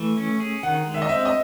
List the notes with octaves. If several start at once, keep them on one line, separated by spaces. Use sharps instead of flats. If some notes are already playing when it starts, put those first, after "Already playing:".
Already playing: E3 A3
C#4
G#4
D#3 F#5
G#3
E5
D#5
C4 E5
D#5